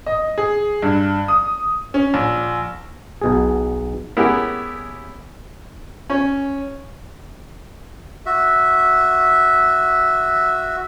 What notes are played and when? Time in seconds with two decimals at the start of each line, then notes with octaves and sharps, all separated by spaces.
0.06 D#5
0.38 G#4
0.82 G2
1.28 D#6
1.94 C#4
2.14 A#1
3.22 B1 B2 G#4
4.17 B3 C#4 E4 G4 G#4 A#4
6.10 C#4
8.26 F#4 E5